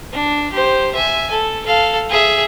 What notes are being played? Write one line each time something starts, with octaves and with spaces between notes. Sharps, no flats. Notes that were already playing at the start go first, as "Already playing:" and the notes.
D4
G4 C5
E5 G#5
A4
A4 F5
G#4 E5